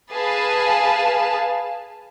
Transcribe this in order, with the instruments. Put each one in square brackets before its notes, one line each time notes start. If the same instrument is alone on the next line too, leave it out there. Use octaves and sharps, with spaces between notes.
[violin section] G#4 B4 F5 A5